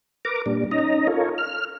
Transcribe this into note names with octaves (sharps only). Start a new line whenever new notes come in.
A#4 B4 A#5 D6
A#2 G3 D4
C#4 D#4 D#5 A#5
F4 A4 A#4 C#5
F6